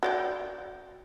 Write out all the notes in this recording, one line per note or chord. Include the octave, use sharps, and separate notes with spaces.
F#4 D5 G5